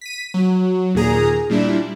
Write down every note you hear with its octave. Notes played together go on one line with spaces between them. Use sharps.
B6 D#7
F#3
D#2 A#2 G#4 A#5
A#2 G3 D4 E4